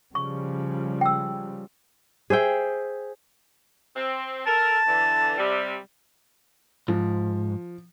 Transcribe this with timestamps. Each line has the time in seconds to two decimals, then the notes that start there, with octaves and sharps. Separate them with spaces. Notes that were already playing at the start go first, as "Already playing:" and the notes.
0.15 C#3 F3 G3 C#6
1.01 G5 E6
2.30 G#4 C5 E5 G5
3.96 C4
4.47 A4 A#4 A5
4.87 D3 E3
5.37 C3 G3
6.88 G#2 F3